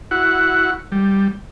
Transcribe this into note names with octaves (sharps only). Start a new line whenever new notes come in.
E4 F#4 F#5
G3